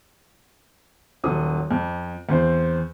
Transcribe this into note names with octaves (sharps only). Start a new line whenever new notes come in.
D#1 F#3 A4 D#6
F2
E2 C4 C5